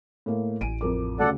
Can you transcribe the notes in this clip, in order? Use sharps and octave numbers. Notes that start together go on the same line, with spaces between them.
A2 A#3
A1 G#5 D7 D#7
F2 A#4 D6
D2 C#3 A4 D5 F#5